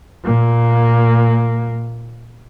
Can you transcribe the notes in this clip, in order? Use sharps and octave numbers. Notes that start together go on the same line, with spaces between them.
A#2 A#3